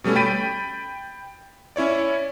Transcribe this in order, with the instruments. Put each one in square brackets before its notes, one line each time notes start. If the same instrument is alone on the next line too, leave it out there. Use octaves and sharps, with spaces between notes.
[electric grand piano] B2 G3 A3 C#4
G5 B5 A6 B6 D7 D#7
C#4 E4 C#5 D5